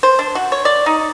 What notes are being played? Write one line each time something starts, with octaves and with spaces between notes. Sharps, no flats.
C5
D4
F#4
C#5
D5
D#4